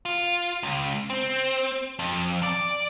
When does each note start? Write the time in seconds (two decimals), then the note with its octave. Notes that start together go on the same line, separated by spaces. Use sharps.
0.05 F4
0.63 C#2
1.10 C4
1.99 F2
2.43 D5